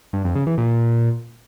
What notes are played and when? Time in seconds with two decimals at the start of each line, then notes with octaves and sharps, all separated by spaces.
0.13 G2
0.24 F2
0.35 C#3
0.47 E3
0.58 A#2